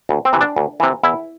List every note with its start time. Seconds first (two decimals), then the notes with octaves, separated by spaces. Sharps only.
0.09 D2
0.25 C4
0.33 C3 E3
0.41 D4
0.56 D2
0.80 C3 E3
1.03 E2 E4